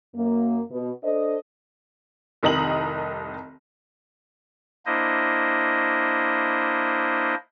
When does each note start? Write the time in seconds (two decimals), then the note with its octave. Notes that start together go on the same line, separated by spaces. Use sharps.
0.15 F#2 A#3
0.71 B2
1.03 D4 A4 C5 D#5
2.43 F1 C2 D#3 D#5 A#5 F#7
4.86 A#3 D4 E4 C5 D#5